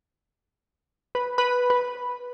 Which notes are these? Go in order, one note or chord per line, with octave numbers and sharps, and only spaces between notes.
B4
B4
B4